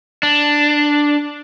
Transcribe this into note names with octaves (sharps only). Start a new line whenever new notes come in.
D4